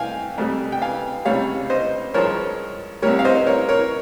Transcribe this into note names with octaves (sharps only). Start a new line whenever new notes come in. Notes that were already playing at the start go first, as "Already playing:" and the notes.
Already playing: C2 F5 G5 G#5
F2 C3 G3
G5
F5 G#5
C#2 C3 G3 C#5 F5
C5 D#5
G2 F3 G#3 A#4 C#5
C2 C3 G3 A#4 C#5
F5
C5 D#5
A#4 C#5
A#4 C#5